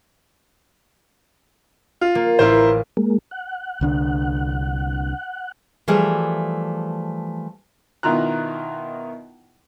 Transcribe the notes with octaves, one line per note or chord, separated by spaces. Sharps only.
F4
A#3
A1 E4 F4 A#4 C5
G#3 A#3
F#5
C2 D3 D4
E3 F3 G3 A3 G#4
B2 D#3 E4 F4 A#5 F#6